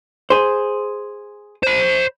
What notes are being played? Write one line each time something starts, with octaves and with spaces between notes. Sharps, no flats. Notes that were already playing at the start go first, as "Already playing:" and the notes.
G#4 C5
C5 B5